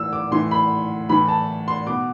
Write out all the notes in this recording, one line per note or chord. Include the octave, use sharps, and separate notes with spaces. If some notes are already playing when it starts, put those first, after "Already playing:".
Already playing: A2 E3 E6
D6
A2 E3 C6
B5
A2 E3 B5
A5
C6
B2 D6